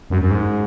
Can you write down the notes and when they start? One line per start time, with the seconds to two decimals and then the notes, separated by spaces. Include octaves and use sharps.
0.10 F#2
0.22 F#2
0.31 G#2